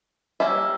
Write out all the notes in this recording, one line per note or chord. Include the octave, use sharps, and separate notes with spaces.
G3 A#3 C#4 E5